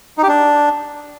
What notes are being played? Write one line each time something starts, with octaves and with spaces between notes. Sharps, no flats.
D#4
G4
D4